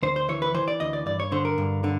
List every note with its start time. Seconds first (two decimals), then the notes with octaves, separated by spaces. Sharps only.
0.03 D2 C5
0.16 C5
0.29 E3 C#5
0.42 B4
0.54 E3 C5
0.68 D5
0.80 D2 D#5
0.93 D5
1.06 G2 D5
1.20 C#5
1.32 D3 C5
1.45 A#4
1.58 G2
1.84 D3